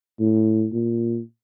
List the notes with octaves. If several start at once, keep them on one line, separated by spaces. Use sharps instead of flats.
A2
A#2